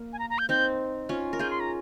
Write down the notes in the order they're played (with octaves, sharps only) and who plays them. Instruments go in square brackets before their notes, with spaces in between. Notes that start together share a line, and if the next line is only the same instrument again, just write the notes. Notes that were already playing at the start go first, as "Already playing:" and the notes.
Already playing: [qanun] A#3
[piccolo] G#5
A#5
A#5
G6
[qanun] C4 D#4 [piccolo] G6
[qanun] C#4 F4
A#4
[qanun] F4 G#4 [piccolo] G6
[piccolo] C6
A#5